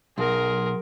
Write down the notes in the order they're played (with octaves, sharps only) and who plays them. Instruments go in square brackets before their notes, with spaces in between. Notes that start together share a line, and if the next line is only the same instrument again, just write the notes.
[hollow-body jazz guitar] B1 [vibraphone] F#3 C6 [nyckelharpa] G#4 A#4